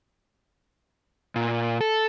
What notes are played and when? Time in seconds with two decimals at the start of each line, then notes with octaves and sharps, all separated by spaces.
1.36 A#2
1.81 A4